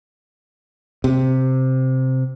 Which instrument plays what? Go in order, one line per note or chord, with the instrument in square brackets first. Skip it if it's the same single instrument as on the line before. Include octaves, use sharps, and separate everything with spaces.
[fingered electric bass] C3